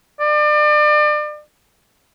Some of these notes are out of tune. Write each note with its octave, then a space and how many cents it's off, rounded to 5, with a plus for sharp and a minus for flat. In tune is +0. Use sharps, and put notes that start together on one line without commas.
D5 +35